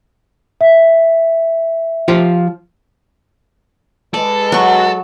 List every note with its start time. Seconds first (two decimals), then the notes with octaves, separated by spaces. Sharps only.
0.61 E5
2.08 F3 F4 G4
4.14 G#3 A4 B4 D5
4.52 F#3 F#4 C#6